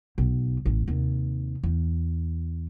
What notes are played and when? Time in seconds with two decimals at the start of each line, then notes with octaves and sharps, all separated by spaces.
0.18 B1
0.66 A1
0.88 D#2 C3
1.64 E2